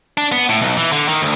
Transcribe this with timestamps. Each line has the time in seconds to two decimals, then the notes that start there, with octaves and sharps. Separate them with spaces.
0.18 D4
0.32 B3
0.49 A2
0.62 B1
0.77 E3
0.92 D3
1.08 D#3
1.22 D2